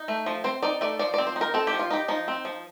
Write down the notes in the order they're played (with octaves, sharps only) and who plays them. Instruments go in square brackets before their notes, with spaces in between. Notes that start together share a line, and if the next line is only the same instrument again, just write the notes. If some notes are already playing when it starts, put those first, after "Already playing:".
Already playing: [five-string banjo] D#4
A3
F3
C4 C5
D#4 D5
A3 D5
F3 D5
D5
C4
C5
D#4
A#4
C4 A4
G4
F3
F4
D#4 G4
F3 D#4
C4
F3